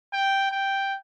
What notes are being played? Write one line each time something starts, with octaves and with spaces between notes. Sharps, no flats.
G5
G5